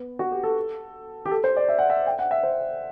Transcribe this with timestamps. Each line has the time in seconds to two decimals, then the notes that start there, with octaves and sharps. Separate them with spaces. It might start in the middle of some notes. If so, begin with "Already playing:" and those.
Already playing: B3
0.19 F#4
0.32 G4
0.43 A4
1.26 G4
1.31 A4
1.44 C5
1.57 D5
1.68 E5
1.79 F#5
1.90 E5
2.06 G5
2.19 F#5
2.31 E5
2.43 C5